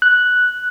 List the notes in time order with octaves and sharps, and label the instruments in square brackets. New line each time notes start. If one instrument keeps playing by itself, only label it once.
[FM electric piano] F#6